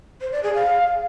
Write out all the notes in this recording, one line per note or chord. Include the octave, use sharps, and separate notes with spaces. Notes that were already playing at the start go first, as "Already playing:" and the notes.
C5
D5
G#4
F5